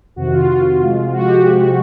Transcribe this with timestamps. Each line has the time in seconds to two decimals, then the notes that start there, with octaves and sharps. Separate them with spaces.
0.16 F2 C3 D#3 F#4
0.33 F4
0.40 F#4
0.48 F4
0.80 C3 F3 G#3
1.12 F#4
1.24 G4
1.28 F#4